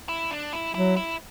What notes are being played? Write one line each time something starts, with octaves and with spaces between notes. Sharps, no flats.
E4
D4
E4
F#3 E4
E4